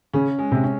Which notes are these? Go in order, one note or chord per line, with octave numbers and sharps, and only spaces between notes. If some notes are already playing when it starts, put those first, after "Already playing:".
C#3 C#4
G#3
C3
C#4